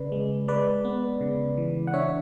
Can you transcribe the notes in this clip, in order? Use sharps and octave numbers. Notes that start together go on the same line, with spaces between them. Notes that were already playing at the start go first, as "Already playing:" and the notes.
Already playing: C#3 B4 D5
G#3
G#3 B4 D5
B3
C#3
E3
F#5
D4 C#5 E5